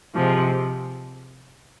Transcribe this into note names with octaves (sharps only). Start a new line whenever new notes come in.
C3 F3 G#3